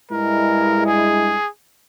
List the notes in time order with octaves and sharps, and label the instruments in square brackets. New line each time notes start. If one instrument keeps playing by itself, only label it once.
[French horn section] G2 G#3 E4 [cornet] A#4
[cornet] G#4